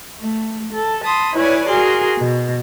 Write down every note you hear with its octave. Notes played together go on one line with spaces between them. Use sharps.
A3
A4
A5 B5 C6 D#6
E4 B4 C#5 D5 G#5
F#4 G#4 A#4 C6
B2